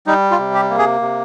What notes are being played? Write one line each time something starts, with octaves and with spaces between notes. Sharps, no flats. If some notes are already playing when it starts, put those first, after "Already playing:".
G3 D#4
F4
C3
G4
A#3
G#4
C3